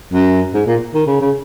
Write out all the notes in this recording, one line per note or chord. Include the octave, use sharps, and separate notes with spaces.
F#2
G#2
A#2
D#3
C#3
C#3